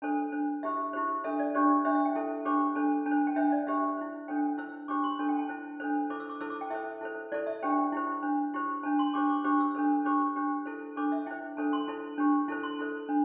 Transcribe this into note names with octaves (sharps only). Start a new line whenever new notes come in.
D4 A4 C5 A5
D4 C5
E4 G4 C5 E5
E4 G4 C5
D4 A4 C5 E5
D5
D4 G4 C5 D5
D4 G4 C5 E5
E5
G5
E4 A4 C5
D4 G4 C5 D6
D4 A4 C5 A5
D4 A5
C5
A5
G5
D4 C5 E5
D5
D4 G4 C5 E5
E4 C5
D4 A4 C5 G5
E4 C5 E6
D4 G4 C5 D6
C6
D4 A4 C5 A5
G5
A5
E4 C5
D4 A4 C5
E4 A4 C5 D6
E6
D6
E4 A4 C5 E6
D6
G5
E4 A4 C5 E5
E4 A4 C5
E4 A4 C5 D5
E5
D4 G4 C5 G5
E4 G4 C5
D4 C5
E4 G4 C5
D4 C5 A5
C6
D4 G4 C5 D6
D6
D4 G4 C5 D6
E6
D4 A4 C5
D4 G4 C5 D6
D4 G4 C5
E4 A4 C5
D4 A4 C5 D6
E5
E4 C5 G5
D4 A4 C5 A5
C6
E4 A4 C5 A5
D4 G4 C5
E4 A4 C5 A5
C6
E4 A4 C5
D4